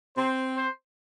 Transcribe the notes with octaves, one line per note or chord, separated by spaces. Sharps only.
C4 C5
C5